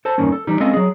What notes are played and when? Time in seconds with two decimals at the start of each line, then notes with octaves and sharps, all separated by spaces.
0.05 A4 C5 A5
0.18 E2 G2 D#3 A#3 C#4
0.32 A4
0.47 E3 G3 D#4
0.60 G#3 C4 C#4 F4 A4 D#5
0.74 F#3 G#4